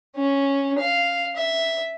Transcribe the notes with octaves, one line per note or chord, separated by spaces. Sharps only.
C#4
F5
E5